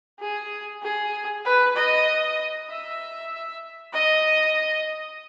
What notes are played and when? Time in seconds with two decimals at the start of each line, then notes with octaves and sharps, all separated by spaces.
0.19 G#4
0.82 G#4
1.45 B4
1.76 D#5
2.69 E5
3.94 D#5